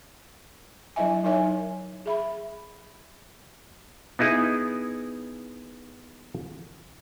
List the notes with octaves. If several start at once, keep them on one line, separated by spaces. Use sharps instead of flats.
F#3 D4 E4 D#5 E5 G#5
F#3 D#4 A#4 C#5 E5 G#5
G#4 E5 B5
B3 D#4 E4 G#4